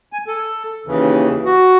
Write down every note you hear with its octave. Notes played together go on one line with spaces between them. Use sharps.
G#5
A4
D#2 C#3 E3
F#4